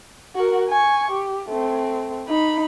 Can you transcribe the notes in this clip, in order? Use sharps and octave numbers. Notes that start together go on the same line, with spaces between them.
F#4 A#4
G#5 C#6
G4
A3 C4
D#4 B5